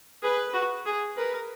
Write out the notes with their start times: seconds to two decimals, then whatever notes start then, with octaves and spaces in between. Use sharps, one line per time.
0.22 G#4 B4
0.54 F#4
0.86 G#4
1.17 A#4 B4